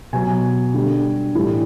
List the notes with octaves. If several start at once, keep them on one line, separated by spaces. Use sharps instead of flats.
B2 F#3 G#5
D3 G3
A2 E3 G3